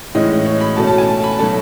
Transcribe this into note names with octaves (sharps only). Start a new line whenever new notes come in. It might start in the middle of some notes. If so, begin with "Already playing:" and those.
A2 E3 G#3 C#4 D#5
C#5
B5
B2 A3 C#4 A5
A5
G#5
A5
B5
B2 F#3 A3 C#4 A5